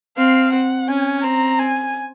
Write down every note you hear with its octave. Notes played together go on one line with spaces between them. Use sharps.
C4 F5
F#5
C#4 G#5
C4 A#5
G#5